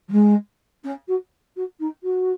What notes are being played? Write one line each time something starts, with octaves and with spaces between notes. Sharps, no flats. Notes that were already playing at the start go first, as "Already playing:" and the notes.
F#3
G#3
C#4
F#4
F#4
D#4
F#4